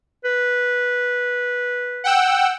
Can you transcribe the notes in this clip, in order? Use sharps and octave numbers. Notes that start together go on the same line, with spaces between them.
B4
F#5 G5 E6